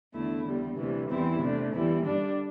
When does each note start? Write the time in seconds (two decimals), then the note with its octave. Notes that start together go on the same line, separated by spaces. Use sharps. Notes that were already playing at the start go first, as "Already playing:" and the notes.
0.15 E2 D3 A3 E4
0.47 E2 D3 G3
0.78 D2 C3 E3 G3
1.10 E2 E3 G3 C4 E4
1.42 C3 A3 D4
1.74 E2 E3 G3 E4
2.05 G2 D3 G3 D4